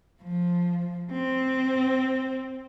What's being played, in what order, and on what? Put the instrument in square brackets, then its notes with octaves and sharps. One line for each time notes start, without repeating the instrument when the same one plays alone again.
[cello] F3
C4